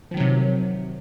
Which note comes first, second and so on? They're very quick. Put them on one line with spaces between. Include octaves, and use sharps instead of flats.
F3 D#3 F#3 C3